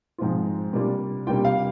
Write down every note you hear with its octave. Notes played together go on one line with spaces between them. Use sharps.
G#2 F3 G#3 C4 F4
C3 G3 A#3 D4 F4
C3 G3 A#3 D4 F4 G5
F5